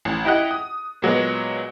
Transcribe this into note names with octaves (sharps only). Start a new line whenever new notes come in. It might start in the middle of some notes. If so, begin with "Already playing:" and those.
A1
E4 G4 D#5 F#5
D#6
A#2 F#3 G#3 B3